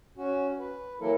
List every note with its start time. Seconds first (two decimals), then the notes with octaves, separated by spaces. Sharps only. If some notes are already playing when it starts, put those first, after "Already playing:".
0.17 C#4 F#4
0.59 B4
1.00 E3 F#3 A#3 E4 A4 A#4